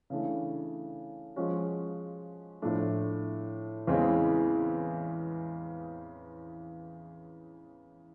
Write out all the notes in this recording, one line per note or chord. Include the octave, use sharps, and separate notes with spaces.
C#3 E3 A3 D4
F3 G#3 C#4 F#4
A2 F3 A3 D4
E2 C#3 E3 G#3 C4